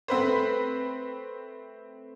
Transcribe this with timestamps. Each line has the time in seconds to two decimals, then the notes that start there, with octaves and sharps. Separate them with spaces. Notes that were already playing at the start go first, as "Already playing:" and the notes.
0.08 A3 C4 B4 C5